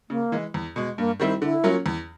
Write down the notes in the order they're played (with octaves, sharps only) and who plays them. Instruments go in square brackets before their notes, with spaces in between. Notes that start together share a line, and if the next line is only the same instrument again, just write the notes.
[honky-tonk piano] C#3 [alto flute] A#3
[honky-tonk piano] E3 G#3
E2
B2 G#3
[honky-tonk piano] G2 [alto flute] A#3
[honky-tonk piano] D#3 G3 C4 E4
[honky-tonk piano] D3 [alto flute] E4
[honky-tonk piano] F#3 A#3 C#4 F4
E2